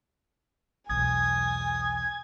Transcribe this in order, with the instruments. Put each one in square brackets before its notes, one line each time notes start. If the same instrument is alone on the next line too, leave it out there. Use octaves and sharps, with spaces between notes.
[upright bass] B1 E2 [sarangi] G#5 [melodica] D#6 [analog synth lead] G#6